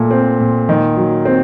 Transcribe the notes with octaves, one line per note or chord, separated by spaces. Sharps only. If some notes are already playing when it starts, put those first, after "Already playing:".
Already playing: A#2 A3
C4
A#2
D#3
F#3
C4